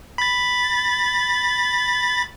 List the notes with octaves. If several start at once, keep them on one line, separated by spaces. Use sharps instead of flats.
B5 A6